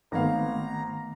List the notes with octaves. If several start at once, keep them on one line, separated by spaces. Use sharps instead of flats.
G#1 D#3 A3 B3 F5 A#5